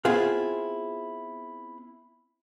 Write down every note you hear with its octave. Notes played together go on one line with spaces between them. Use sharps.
B3 C4 E4 F4 G#4 F5